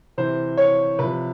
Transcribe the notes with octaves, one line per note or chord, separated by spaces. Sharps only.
C3 E3 C5
C#5
C3 F3 B4